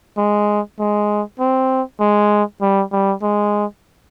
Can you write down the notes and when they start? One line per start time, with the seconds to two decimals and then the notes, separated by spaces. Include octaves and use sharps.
0.18 G#3
0.79 G#3
1.39 C4
2.00 G#3
2.61 G3
2.92 G3
3.22 G#3